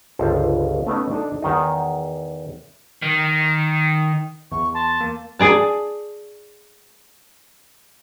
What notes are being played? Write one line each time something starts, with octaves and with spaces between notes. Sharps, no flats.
G1 C#2 C5 A5
A3 B3 C#4 D#4
D4 D#4 A4
E2 D#3 D#4
D#3
E2 C#6
A5 C6
A#3
G#4 D5 A5